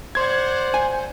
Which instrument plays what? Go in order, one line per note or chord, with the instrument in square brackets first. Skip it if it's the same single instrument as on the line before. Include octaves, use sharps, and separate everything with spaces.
[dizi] C5 [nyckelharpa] D5 F#5 [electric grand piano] C6 G#6
[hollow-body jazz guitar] G#5